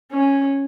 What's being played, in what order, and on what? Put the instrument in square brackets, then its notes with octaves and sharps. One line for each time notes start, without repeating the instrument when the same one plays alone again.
[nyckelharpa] C#4